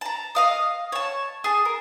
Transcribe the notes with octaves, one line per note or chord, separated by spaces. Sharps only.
A5 A#5
D#5 F5 D#6
C#5 A5
G#4 A5
A#4